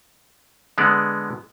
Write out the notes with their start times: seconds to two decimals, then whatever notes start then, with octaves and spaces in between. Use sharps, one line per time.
0.78 D3 G#3 B3 D5